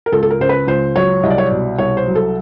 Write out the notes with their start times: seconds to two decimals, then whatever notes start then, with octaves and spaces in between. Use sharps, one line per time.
0.06 A#4
0.12 C#2 A4
0.23 A4
0.30 A#4
0.40 C#3 C5
0.49 B4
0.67 C#2 C5
0.96 F#3 C#5
1.23 C2 D#5
1.30 D5
1.38 C#5
1.46 B2 D5
1.78 C2 C#5
1.97 C5
2.06 F#3
2.15 A4